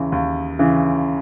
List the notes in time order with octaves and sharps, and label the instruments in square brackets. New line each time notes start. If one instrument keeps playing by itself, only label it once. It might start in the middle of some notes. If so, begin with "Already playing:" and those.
Already playing: [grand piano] D#2 C#3 E3
D#2
C#3 E3